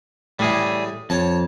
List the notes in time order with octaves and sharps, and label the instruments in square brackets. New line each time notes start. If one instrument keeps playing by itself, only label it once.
[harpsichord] A2 E3 [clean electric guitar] G3 G#4
[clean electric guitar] F2 [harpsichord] C#5 A5